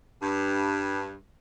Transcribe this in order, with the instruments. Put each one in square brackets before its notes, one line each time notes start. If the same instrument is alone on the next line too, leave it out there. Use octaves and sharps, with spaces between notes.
[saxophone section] G2